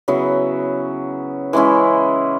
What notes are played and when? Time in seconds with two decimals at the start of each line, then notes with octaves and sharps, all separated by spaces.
0.08 C#3 F#3 B3 E4
1.53 E3 G#3 C#4 E4